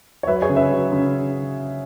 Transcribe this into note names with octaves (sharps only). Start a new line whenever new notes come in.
C#5
F#3 B4 E5
G#4 C#5
C#3
B4 E5
F#3
C#3